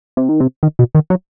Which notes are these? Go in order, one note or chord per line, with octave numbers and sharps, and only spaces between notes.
C3
D#3
C3
D#3
B2
D#3
F#3